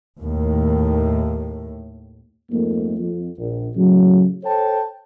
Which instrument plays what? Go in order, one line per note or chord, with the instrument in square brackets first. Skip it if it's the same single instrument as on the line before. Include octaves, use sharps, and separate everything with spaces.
[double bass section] D#2 A2
[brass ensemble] F2 G#2 A3 A#3
F2
A#1
A2 C#3 F#3
A4 C5 C#5 G5 A5